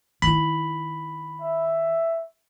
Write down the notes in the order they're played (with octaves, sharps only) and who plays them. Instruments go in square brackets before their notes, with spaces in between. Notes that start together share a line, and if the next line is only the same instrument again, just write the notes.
[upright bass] D#3 E4 [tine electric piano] B5
[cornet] E5